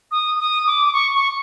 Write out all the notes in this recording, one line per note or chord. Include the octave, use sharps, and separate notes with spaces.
D#6
D#6
D6
D6
C#6
C#6